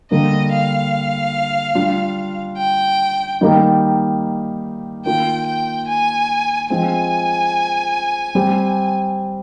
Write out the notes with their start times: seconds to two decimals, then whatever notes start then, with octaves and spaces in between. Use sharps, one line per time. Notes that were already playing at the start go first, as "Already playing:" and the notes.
0.11 D3 G3 A#3 D4 D#5
0.53 F5
1.75 G3 D4 F4
2.58 G5
3.41 D#3 G3 A#3 D#4 G4
5.06 D#3 A#3 F4 G5
5.47 G5
5.88 G#5
6.70 F3 G#3 C4 G#5
8.35 G3 C4 G4